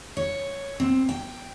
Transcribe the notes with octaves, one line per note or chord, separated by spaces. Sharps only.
C#5
C4
G5